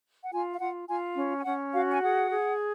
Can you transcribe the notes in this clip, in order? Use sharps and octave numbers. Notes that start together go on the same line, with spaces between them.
F#5
F4 G#5
F5
F4 F#5
F4 G#5
C#4
G#5
C#4 F#5
F#4 F5
G#5
G#4 F#5
G#4